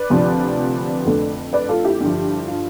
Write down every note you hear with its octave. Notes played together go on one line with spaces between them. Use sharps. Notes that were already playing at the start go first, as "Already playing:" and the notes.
Already playing: B4 D5
D2 C3 F3
F2 D3 A3
B4 D5
F4 A4
E4 G4
G2 D3 F3
F4